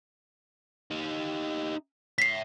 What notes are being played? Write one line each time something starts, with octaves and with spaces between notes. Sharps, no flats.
D#4 G4
C#5 E5 B6 C7